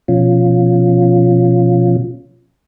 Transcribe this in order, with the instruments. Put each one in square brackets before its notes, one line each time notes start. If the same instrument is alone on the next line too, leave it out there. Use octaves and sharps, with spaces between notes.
[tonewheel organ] B2 F3 C#4 F4